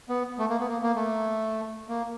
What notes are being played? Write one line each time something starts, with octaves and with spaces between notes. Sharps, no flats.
B3
A3
A#3
B3
A#3
A#3
A3
A#3